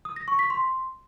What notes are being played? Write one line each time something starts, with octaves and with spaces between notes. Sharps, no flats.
D#6
A#6
C#6
B6
C6